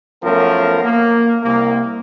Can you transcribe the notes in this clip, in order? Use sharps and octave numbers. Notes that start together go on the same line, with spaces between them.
F#2 F3 A3 B3 C#4 A#4
A#3
C2 A#3